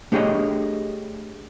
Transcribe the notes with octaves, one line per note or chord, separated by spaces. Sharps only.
A3 D4 G4 G#4 C#5 D#5